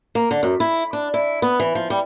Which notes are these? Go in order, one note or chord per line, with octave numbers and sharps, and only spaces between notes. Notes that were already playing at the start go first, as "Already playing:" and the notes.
A#3
D3
F#2
E4
D4
E4
B3
E3
F3
G3